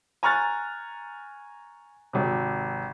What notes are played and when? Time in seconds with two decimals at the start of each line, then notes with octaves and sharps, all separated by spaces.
0.23 G#5 A#5 C#6 F6 F#6 A6
2.13 G#1 C3